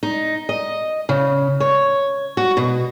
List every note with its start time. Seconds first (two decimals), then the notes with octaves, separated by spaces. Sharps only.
0.03 D#4
0.49 D#5
1.09 C#3
1.60 C#5
2.37 F#4
2.57 B2